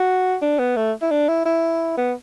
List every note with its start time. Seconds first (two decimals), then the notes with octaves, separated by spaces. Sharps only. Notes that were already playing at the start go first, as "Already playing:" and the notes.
Already playing: F#4
0.42 D4
0.59 B3
0.76 A3
1.02 E4
1.11 D4
1.28 E4
1.45 E4
1.98 B3